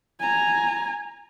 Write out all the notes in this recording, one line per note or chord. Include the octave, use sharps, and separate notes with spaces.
G#5 A#5